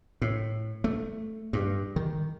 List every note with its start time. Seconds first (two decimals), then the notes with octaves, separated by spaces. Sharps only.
0.22 A2
0.84 A3
1.53 G2
1.96 D#3